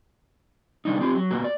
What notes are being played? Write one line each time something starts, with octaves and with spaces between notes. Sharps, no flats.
C3 G3 D4 D#4
C4 F4 G4
F#3
A#2 A#3 B3 F#4
D5